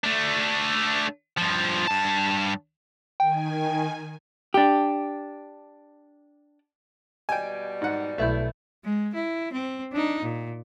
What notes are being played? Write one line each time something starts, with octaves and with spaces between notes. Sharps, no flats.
A3 D4
G2 F3
G2 A5
D#3 G5 G#5
D4 G4
B2 G3 D#5 G5 G#5
G#2 F#5
B1 A3 E4 B4 E5 G6
G#3
E4
C4
D4 D#4
A#2